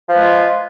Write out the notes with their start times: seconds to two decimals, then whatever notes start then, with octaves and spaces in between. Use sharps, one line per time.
0.09 F3
0.12 B4
0.15 G#3
0.18 F4